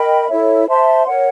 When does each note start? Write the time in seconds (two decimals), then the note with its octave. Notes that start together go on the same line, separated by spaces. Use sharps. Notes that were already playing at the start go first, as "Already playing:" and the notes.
Already playing: A#4 D#5 G5 B5
0.28 E4 A4 C#5 E5
0.67 C5 E5 A5 C6
1.06 A#4 C#5 F#5